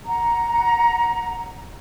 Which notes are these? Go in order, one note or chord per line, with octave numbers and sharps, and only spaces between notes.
F#5 A#5